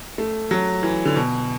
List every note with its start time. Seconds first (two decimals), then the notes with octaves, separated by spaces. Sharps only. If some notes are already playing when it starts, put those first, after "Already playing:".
0.18 A3
0.51 F#3
0.83 E3
1.05 D3
1.16 B2